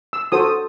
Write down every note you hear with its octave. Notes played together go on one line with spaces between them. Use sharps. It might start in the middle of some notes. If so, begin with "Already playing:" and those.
E6
F#4 A4 C5 D#6